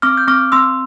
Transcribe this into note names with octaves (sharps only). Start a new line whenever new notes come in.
C4 D6 F6
G6
C4 D6 F6
C4 C6 E6